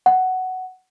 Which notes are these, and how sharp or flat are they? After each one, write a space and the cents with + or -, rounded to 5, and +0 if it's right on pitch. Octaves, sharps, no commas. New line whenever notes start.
F#5 +10